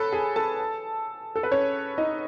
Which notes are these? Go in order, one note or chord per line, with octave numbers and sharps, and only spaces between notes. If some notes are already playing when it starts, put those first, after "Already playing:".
Already playing: A4 B4 C#5 A5 B5
G#4 G#5
A4 A5
A4
B4
C#4 C#5
D#4 D#5